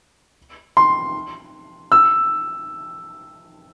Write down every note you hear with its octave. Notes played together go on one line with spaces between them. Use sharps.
C6
E6